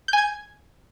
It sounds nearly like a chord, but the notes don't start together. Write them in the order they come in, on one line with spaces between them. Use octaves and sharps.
G6 G#5 G#6